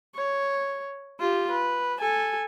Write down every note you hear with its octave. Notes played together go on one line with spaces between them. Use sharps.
C#5
F4 G4
B4
A4 G#5